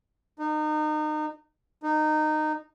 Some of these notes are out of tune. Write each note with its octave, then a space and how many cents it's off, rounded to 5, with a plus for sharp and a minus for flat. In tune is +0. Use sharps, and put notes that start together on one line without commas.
D#4 -30
D#4 -20